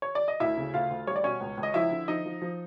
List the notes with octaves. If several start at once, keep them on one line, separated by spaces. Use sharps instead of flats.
C#5
D5
D#5
D2 E4 E5
C#3
D2 F4 F5
D2
G3 C#5
D5
B2 C#4 C#5
C#2
C#2
D#5
F3 E4 E5
D3
F3 D#4 D#5
F3
F3